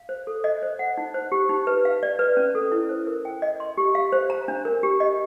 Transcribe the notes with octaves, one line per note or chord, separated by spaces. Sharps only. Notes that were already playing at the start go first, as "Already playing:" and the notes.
Already playing: F5
C5
A4
D#5
C5
F#5
D#4
C5
G4
D#4
B4
F5
D5
B4
C#4
A4
E4
C5
A#4
G5
D#5
C6
G4
F5
C5
A#5
D4
A#4
G4
D#5